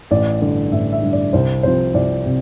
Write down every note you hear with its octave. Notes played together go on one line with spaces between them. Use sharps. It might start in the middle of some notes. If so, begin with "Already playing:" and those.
A1 D5
G2 D3
A1 E5
E5
G2 D3
D5
C2 C5
C3 F3 C5
C2 D5
C3